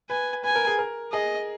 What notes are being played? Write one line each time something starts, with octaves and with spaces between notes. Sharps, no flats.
B4 G#5
B4 G#5
A#4
G#4
A#4
G#4 D#5